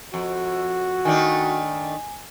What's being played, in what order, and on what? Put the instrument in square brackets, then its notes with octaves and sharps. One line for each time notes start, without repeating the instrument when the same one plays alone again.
[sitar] F2 [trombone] F#4
[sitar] D#3 A3 D4 [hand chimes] G#5